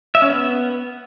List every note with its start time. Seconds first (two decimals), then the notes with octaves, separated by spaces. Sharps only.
0.15 E5
0.22 C#4
0.29 B3